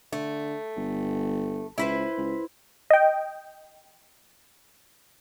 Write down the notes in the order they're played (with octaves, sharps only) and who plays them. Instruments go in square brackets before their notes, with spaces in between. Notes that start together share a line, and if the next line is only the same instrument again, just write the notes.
[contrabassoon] D3 [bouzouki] A3
[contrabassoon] G1
[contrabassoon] C#2 [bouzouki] E4 B4 C5
[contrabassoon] C#2
[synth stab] D#5 G5